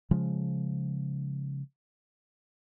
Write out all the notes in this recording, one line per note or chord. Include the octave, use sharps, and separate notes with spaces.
C#3 F3 G#3